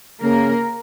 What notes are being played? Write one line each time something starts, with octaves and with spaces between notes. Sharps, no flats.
C#3 A#3 A#4